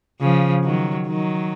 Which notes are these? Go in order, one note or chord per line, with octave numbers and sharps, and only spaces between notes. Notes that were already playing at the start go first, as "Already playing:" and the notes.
C#3 F3
D#3 F#3
D#3 F#3